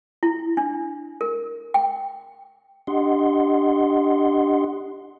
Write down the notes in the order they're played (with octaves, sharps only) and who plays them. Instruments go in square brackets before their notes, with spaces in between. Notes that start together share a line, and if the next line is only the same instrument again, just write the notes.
[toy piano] E4
D4
A#4
G5
[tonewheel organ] D4 G4 D#5 F#5 C6